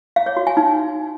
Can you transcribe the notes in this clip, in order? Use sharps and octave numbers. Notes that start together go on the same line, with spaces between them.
F5
C#5
F#4
G#5
D#4